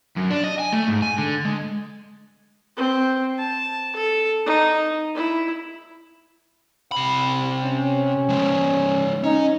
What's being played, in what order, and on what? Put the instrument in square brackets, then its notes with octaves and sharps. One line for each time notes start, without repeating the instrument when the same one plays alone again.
[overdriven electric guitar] F#2
D4
D#5
G#5
A3
G#2
G#5
D3
G#3
[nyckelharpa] C4
A5
A4
D#4
E4
[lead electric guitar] C3 B5
[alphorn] C#4
[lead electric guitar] F3 G#3
[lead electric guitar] C#4 [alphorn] D#4